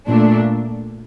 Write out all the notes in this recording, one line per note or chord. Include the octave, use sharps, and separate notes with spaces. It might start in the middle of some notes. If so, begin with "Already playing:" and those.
A#2 A3 D4